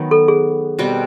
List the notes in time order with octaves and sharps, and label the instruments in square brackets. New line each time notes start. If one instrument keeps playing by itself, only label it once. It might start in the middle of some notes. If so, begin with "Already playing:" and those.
Already playing: [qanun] D#3 F#3 B3
[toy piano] A4
G#4
[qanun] B2 G3 C4